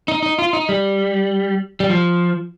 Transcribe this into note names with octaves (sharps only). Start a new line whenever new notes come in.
D#4
D#4
F4
D#4
G3
G3
F3